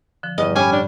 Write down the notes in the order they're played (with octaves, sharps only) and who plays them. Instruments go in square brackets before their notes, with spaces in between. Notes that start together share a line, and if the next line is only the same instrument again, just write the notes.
[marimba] D3 F3
[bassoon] E2 [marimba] G2 G3 [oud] D#5
[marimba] A2 B5 [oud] C#4 [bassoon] G4 [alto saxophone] G#5
[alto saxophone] D4